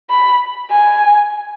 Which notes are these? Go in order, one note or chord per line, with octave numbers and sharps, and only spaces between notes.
B5
G#5